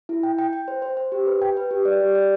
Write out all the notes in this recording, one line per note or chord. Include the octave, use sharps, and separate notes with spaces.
E4
G5
G5
G5
C5
C5
C5
G4
B4
G5
B4
G4
D5
G4
D5